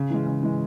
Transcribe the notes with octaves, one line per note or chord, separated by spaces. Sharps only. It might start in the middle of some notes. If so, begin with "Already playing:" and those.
Already playing: C#3
E3 G#3
C#3
E3 G#3